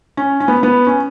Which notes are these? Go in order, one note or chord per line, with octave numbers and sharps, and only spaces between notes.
C#4
C#4
B3
B3
C#4